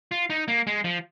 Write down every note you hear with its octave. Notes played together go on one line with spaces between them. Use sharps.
F4
D#4
A#3
G#3
F3